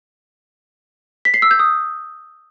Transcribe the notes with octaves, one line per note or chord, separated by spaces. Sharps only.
B6
C7
E6
G6
D#6